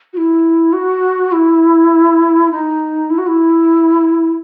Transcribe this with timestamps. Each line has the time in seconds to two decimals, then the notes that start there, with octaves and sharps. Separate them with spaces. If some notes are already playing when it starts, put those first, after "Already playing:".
0.13 F#4
0.17 E4
0.73 F#4
1.32 E4
2.51 D#4
3.10 E4
3.18 F#4
3.27 E4